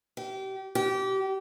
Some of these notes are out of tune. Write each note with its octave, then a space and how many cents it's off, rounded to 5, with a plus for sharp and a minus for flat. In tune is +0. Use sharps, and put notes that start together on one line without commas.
G4 -30
G4 -25